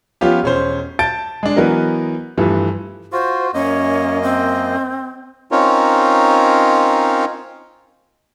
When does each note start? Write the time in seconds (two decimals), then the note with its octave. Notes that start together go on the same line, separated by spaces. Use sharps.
0.21 F3 B3 C#4 F4 G4
0.43 E1 C#4 C5
0.99 A5 G6 A6 D7
1.43 G#3 D4
1.56 E3 F#3 B3 A#4 D#5
2.37 G2 E3 F3 A3
3.12 F4 F#4 C5
3.54 F#2 A#3 C#4 D#5
4.23 C4
5.51 C4 C#4 D#4 F4 A#4 C#5